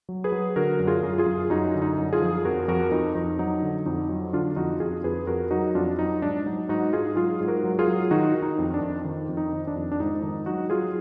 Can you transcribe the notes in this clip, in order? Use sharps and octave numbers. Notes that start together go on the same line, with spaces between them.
F#3
G#4 B4
F#3
D3 F#4 A#4
F#2
F4 G#4
F#2
F4 G#4
F#2
F#2 D#4 F#4
D3
D#4
F#2
F4 G#4
F3
F2 F#4 A#4
F2 F#4 A#4
F2 D#4
F2 D#4
F#3 D#4
D3
F2 D#4
F#3
D3 D4 F4
F2 D#4 F#4
F2 F4 G#4
F2 G#4 B4
F2 F#4 A#4
F#3 D#4 F#4
F2 D4 F4
F#3 D#4
G#2 D4
F#3 D#4
G#2 D#4 F#4
G#2 F4 G#4
F#3 F4 G#4
G#2
F#4 A#4
F#3
F4 G#4
F#3
D#3 D#4 F#4
D#3
D#4
F2
D4
F2
D#3
F2
D#4
D#3
D4
F2
D4
G#2 D#4
D#3 D#4
F#3 D#4 F#4
F#3 F4 G#4